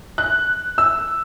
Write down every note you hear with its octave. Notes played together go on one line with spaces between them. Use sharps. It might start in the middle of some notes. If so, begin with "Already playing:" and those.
F#6
E6